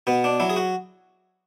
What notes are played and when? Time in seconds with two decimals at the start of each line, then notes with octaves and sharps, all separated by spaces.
0.07 B2 B3
0.24 D4
0.40 F#3 E4
0.50 G#4
0.56 F#4